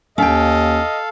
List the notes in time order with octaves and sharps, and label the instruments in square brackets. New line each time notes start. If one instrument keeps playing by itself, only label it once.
[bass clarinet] D#2 [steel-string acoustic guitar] C#4 G5 [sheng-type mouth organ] A4 F5 [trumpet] D#5